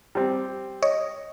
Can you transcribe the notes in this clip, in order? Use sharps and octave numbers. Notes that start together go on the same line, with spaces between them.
G3 C4
C#5 D#5